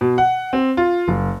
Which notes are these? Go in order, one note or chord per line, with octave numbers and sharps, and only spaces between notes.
B2
F#5
C4
F4
F#1